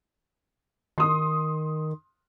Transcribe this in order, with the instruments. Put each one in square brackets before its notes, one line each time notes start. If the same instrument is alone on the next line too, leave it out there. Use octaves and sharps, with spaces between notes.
[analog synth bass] D#3 [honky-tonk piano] C6 D#6